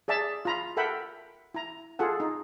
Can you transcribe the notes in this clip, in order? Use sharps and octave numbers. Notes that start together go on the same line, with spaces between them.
G#4 D5 E5 A5
F4 A#5 B5
A4 A#4 E5 F#5 G5 B5
E4 A#5
F4 G#4 A4 F#5
D#4